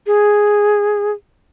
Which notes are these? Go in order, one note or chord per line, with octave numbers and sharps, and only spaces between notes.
G#4